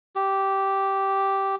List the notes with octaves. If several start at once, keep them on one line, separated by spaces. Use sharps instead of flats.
G4